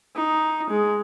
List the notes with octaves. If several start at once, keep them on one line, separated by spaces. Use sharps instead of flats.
D#4
G#3